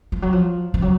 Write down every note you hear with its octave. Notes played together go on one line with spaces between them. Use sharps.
F3
F#3
F3
F3
F#3